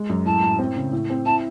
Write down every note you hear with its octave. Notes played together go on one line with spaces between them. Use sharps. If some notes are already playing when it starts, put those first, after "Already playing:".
Already playing: G#3
F#2
A2 A5
A2
C4
C#3
A2
C4
E4 A5